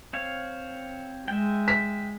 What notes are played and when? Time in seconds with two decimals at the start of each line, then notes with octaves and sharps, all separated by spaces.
0.13 C4 C#5 F5
1.28 G#3 E5 G5
1.68 B6